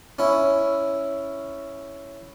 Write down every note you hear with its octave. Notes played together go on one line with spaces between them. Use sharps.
C#4 E4